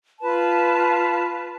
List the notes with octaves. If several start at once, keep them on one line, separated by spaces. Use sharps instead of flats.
F4 B4 A5